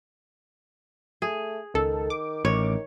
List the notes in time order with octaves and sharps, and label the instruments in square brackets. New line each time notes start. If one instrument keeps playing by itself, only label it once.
[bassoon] A3 [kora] G#4
[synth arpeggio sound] C#2 A4 [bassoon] D#3
[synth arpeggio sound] D6
[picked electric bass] A1 [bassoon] D#3 [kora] C#5